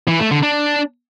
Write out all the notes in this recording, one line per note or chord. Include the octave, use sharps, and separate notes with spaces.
E3
A3
D3
D4